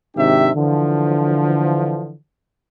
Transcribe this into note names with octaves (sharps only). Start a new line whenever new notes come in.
G#1 C3 D4 D#4 G4 E5
D3 E3 F3